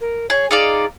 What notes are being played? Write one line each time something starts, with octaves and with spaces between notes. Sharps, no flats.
A#4
G#4 C#5
D#4 F4 G#4 D5